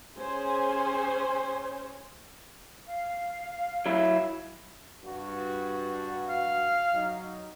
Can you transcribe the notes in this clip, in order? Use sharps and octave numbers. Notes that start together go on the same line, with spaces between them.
C#4 G#4 C5 G#5
F5
F#3 E4
G2 F#4
F5
F#3 D#4